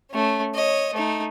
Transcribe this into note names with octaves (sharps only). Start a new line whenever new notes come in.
A3 C#4
C#5 D#5
A3 D#4